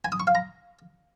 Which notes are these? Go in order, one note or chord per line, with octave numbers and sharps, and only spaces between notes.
G#5
D#6
C#6
F5
A#5